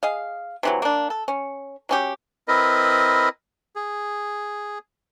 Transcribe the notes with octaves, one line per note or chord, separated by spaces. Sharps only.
G#4 D#5 F5
C3 E3 F#3
A#3 D4
A4
C#4
F#3 C#4 G4
C4 E4 A#4 B4 D#5
G#4